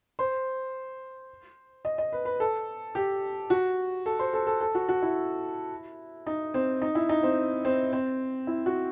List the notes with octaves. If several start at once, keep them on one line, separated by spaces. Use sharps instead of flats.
C5
D#5
D#5
B4
B4
A4
G4
F#4
A4
C5
A4
A4
A4
F#4
F#4
E4
D#4
C4
D#4
E4
D#4
C4
C4
C4
E4
F#4